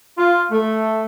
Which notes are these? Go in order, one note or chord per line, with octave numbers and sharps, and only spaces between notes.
F4
A3